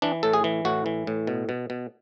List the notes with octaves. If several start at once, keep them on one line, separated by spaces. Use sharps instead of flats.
E3 D4
A2 A4
G#4
E3
A2 F#4
E3
A2
B2
B2
B2